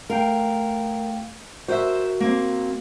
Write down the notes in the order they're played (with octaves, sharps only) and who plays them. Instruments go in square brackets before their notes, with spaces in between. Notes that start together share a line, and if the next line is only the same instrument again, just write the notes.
[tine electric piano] A3 F5 G5 [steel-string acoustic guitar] A#4
[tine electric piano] F#4 A#4 [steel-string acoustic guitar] C5 D5 E5
[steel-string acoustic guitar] A#3 C4